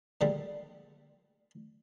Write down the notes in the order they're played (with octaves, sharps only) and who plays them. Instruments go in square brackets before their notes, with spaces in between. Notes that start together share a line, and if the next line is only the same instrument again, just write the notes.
[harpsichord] A#2 D3 G3 G#3